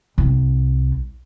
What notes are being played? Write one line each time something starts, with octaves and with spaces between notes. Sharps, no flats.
C2